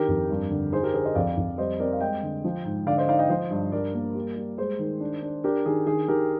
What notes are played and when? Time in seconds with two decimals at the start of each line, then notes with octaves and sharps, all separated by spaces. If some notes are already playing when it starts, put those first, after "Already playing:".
Already playing: D#3 D4 G4 A#4
0.08 F2
0.30 G2
0.51 D3
0.72 D#4 G#4 C5
0.83 G4 A#4
0.94 D3 G#4 C5
1.05 C5 D#5
1.15 F2 D5 F5
1.37 F2
1.58 G3 C5 D#5
1.80 C4 A#4 D5
1.93 F5
2.01 G#3 D#5 G5
2.23 D3
2.44 F3
2.65 G#2
2.86 D3 D5 F5
2.97 C5 D#5
3.08 D#4 D5 F5
3.19 D#5 G5
3.29 F3 C5 D#5
3.50 G2
3.72 G2 A#4 D5
3.94 A#3
4.15 G3
4.37 G3
4.58 G#3 G#4 C5
4.79 D#3
5.00 D4
5.22 D4
5.44 D4 G4 A#4
5.66 D#3 G#4
5.86 D#3 G#4
6.08 D#3 G4 A#4